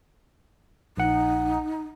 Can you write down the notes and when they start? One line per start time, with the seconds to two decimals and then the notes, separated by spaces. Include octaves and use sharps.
0.97 A#1 D#4 F#5